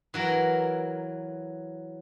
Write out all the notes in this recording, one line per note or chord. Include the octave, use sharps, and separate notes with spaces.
E3 F#3 A#4